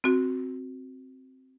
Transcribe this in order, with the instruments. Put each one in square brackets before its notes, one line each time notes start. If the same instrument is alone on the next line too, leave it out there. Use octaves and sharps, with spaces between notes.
[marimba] C4 F#4